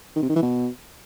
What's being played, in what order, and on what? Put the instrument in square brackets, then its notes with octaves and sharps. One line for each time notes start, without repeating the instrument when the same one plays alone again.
[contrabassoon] D#3
C3
D#3
E3
B2